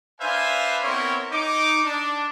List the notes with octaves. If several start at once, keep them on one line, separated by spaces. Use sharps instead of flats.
D4 B4 C5 E5 F5 G#5
B3 C4 E4 A#4 C#5
D#4 D6
D4